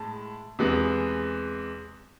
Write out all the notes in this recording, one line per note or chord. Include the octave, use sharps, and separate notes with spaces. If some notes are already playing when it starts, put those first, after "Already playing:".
Already playing: A2 G#3 A5
E2 C3 G#3 B3